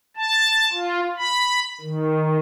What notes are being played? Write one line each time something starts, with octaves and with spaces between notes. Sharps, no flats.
A5
F4
B5
D#3